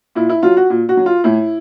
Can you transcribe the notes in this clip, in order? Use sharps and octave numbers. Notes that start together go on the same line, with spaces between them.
A#2 E4
E4
F#3 F4
F#4
A#2
F#4
F#3
F4
A2 E4